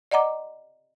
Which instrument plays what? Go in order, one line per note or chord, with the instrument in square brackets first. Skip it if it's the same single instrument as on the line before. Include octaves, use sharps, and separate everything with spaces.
[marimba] D5 D#5 F#5 A#5 D6